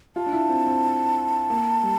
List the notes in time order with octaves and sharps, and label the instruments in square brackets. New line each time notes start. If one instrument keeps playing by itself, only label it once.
[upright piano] F4 [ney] A5
[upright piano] D4
E4
C4
C4
A#3
G3